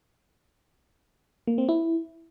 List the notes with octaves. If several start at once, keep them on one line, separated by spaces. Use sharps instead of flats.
A#3
C4
E4